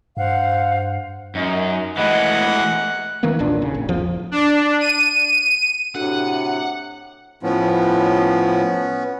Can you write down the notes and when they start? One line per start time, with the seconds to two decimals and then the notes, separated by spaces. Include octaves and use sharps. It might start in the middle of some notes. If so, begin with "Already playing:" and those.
0.17 G2 C5 F5 F#5
1.35 F#2 C#4 D#4
1.97 E3 G#3 A3 D#5 F#5
3.23 D#3 E3 A#3 B3
3.39 E1 B1 A#2 D4
3.62 C#3
3.74 A1
3.89 G1 E2 F3
4.31 D4
4.81 D#7
5.95 A2 C3 D4 F#4 A4 F#5
7.43 A2 F3 B3 C#4